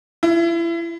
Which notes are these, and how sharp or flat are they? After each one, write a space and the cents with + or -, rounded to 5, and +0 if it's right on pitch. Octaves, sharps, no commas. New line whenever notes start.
E4 +30